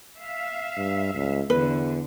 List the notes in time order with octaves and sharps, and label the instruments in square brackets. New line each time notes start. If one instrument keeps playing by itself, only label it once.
[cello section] E5 F5
[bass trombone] G2
C#2
[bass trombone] E2 [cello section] D3 [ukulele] B4